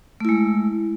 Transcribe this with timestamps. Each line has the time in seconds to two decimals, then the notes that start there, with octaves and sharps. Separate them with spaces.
0.20 A3
0.25 E4
0.29 G#3